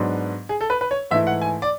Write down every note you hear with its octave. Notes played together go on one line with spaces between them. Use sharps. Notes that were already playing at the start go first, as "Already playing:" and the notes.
Already playing: G#2 F#3 B3 D4
G#4
A4
B4
B4
C#5
G#2 E3 A3 E4 E5
F#5
G#5
D5